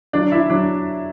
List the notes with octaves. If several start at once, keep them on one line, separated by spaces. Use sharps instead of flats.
F#3 D4 D5
E4 E5
F#3 D4